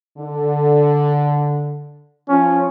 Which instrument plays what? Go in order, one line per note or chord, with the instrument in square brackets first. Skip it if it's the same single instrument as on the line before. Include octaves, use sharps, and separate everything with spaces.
[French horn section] D3
[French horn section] F3 F4 [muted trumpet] C#4